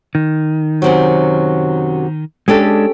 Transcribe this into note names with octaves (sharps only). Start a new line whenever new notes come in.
D#3
F#2 C3 F#3
G#3 C#4 D4 G4 A4